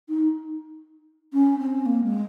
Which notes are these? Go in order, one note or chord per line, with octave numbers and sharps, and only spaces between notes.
D#4
C#4
C4
A#3
G#3